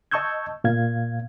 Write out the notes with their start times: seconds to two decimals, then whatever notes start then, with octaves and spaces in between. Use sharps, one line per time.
0.11 D#5 A5 C#6 E6 G6 G#6
0.64 A#2 F5 G#6